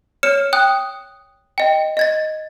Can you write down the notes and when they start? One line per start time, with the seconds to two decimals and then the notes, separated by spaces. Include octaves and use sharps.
0.23 C#5 F6 C#7 E7
0.53 G5 D#6 F#6
1.58 D#5 G5
1.97 D#5 G#6 A6